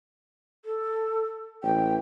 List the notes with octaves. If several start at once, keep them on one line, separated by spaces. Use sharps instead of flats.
A4
A1 G5